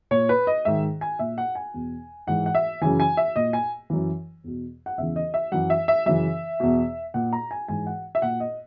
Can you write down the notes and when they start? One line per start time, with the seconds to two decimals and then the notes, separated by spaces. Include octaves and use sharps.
0.11 A#2 C#5
0.29 B4
0.47 D#5
0.65 G#2 D#3 E5
1.01 G#5
1.19 A#2 E5
1.38 F#5
1.55 G#5
1.74 E2 B2
2.27 G#2 E3 F#5
2.46 F#5
2.55 E5
2.81 F#2 C#3 E3 G#5
3.00 G#5
3.17 E5
3.36 A#2 D#5
3.53 G#5
3.90 F#2 E3
4.44 E2 B2
4.86 F#5
4.98 E2 C#3 E3 E5
5.16 D#5
5.34 E5
5.52 F#2 E3 F#5
5.70 E5
5.88 E5
6.06 F#2 C#3 E3 E5
6.60 E2 B2
7.14 A#2 F#5
7.33 A#5
7.51 G#5
7.68 G#2 E3 G#5
7.87 F#5
8.15 E5
8.22 A#2 F#5
8.40 D#5